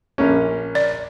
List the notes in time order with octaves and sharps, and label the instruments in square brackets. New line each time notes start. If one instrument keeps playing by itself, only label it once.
[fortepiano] A#1 A#3 C#4
[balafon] D5